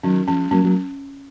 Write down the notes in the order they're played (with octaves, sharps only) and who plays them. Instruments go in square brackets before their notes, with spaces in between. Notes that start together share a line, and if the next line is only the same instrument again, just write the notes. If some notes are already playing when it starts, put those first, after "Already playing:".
[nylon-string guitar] D#3 F#3 [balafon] C#4
[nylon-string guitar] F3 G#3 [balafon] C#4
[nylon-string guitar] F#3 A#3 [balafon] C#4
[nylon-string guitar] F#3 A#3